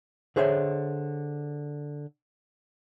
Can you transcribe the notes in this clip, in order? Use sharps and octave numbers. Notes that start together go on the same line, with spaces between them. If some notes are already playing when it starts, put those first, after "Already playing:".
D3 G#4 C5 C#5 E5